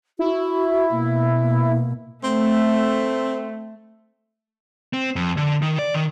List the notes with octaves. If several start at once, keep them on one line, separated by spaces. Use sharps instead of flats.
E4 F#4
B2 A#3
A#3
A3 C4
C4
F2
D3
D#3
D5
D#3